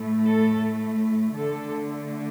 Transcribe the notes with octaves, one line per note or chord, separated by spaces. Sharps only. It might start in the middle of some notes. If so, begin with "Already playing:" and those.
Already playing: A2 A3
A4
D3 A3 A4